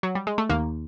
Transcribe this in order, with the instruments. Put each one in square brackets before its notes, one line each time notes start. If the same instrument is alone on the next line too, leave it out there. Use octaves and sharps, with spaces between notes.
[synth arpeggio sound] F#3
G3
G#3
A3
[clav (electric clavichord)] D#2 [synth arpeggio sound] A#3